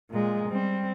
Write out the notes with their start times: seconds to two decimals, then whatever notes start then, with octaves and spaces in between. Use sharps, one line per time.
0.11 A#2 G#3
0.48 G3 C4